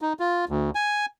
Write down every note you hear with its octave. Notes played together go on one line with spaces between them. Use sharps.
D#4
F4
D2
G#5